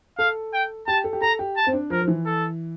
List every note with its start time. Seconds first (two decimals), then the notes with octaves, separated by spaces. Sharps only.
0.18 A4 F5
0.53 G5
0.87 G4 A5
1.04 A4
1.13 G4
1.21 A4 A#5
1.39 G4
1.56 A5
1.67 C4
1.73 D4
1.90 F3 A#4
2.02 F3
2.08 E3
2.26 A4